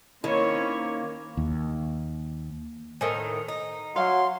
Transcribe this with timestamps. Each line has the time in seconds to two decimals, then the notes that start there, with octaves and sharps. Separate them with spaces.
0.24 D#3 A#3 C4 C#4 E4 C#5
1.37 D#2
3.01 A2 D#3 A4 C5 G#5
3.48 D#4
3.96 F#3 F5 C6